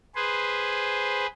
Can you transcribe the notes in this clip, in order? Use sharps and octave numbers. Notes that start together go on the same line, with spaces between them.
G#4 B4 C5